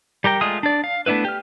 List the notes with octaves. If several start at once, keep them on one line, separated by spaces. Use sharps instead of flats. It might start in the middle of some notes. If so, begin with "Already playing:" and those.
G3 G4 A#4 G5
G#3 A3 F4 D#6
D4 D5
F5
A3 B3 D4 E4 B4
G4 F6